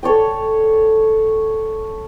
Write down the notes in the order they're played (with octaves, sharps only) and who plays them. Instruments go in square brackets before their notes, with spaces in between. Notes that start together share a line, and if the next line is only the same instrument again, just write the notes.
[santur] A4 C#5 D5 G5